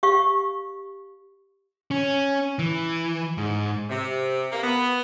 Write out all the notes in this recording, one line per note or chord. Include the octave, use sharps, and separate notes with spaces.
G4 F5 C#6
C#4
E3
G#2
C3
A#3
B3